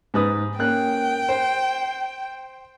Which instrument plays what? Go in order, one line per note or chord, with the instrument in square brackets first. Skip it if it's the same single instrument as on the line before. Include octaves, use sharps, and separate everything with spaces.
[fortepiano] G#2 B4 D#6
[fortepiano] A#3 C#4 F#6 [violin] G5
[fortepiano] C5